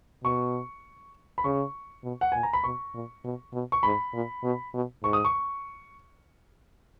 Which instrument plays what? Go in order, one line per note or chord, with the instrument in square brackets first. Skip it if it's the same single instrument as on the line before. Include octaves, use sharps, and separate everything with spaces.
[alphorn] B2 [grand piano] C#6
[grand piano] B5
[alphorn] C#3 [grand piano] C#6
[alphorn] B2
[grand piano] F#5
[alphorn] A#2 [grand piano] G#5
[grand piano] A#5
B5
[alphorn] B2 [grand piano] C#6
[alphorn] A#2
B2
B2
[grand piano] C#6
[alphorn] G#2 [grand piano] B5
[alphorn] A#2
B2
B2
[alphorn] G#2 [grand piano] C#6
[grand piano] D#6
C#6